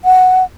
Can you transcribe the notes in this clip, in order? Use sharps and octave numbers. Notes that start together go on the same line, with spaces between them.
F#5